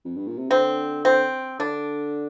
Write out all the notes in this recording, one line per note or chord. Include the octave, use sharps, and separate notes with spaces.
F2
G2
A#2
C3
D3 C4
C4
D3 D4